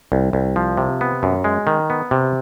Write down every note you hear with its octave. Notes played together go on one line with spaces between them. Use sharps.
C2
C2
F3
C3
B3
F#2
G#3
D#3
B3
C3